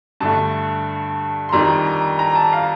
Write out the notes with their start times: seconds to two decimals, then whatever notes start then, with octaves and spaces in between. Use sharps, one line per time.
0.20 G2 D3 A3 A5
1.49 C6
1.53 F2 D#3 G3 D4 A#5
1.86 A#5
2.19 A#5
2.36 A5
2.53 F5